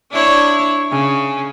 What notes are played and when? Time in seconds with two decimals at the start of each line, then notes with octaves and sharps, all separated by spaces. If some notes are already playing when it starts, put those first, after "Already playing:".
0.11 D4 E4 C#5
0.90 C#3